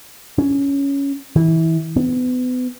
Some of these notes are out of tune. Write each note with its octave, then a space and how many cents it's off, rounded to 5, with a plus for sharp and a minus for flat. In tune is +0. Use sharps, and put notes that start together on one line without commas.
C#4 +10
E3 -25
B3 +30